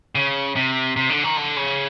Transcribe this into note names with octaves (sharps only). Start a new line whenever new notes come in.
C#3
C3
C3
D3
D#3
D3
C#3